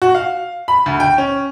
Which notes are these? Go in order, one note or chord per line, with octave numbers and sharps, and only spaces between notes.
F#4
F5
B5
D2
G5
C#4